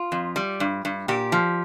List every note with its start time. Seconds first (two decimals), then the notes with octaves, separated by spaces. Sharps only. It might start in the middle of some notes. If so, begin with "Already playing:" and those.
Already playing: F4
0.12 F2
0.36 G3
0.60 G2
0.85 G2
1.08 A#2 G4
1.32 F3